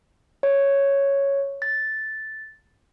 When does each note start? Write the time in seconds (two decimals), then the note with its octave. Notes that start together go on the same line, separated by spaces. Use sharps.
0.43 C#5
1.62 A6